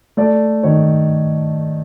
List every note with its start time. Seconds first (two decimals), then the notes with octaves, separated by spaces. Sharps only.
0.17 A3 D5
0.63 D#3 C#5